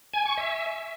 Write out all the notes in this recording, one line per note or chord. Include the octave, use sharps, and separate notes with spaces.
G#5
C#6
E5